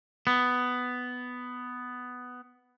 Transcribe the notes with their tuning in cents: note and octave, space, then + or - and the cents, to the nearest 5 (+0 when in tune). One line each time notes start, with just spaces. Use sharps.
B3 +10